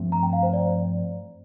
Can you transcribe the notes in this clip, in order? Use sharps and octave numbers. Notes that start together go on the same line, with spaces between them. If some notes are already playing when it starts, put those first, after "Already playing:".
Already playing: G2 F3 A3 C4
A#5
G5
F5
C5
D5